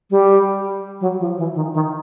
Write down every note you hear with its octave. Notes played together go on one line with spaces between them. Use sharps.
G3
F#3
F3
E3
D#3
D#3